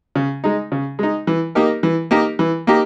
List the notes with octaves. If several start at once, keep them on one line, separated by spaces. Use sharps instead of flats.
C#3
G#3 D#4
C#3
G#3 D#4
E3
A#3 D#4 G4 A#4
E3
A#3 D#4 G4 A#4
E3
A#3 D#4 G4